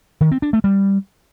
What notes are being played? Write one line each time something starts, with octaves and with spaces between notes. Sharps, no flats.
D#3
C4
D4
A3
G3